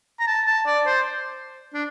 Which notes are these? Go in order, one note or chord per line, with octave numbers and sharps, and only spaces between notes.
A#5
A5
A5
D5
C5
D4